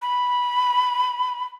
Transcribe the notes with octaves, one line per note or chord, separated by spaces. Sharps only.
B5